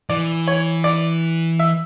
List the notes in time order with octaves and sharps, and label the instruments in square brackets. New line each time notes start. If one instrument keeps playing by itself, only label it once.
[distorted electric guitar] E3 [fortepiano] D5
[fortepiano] C#5
D5
E5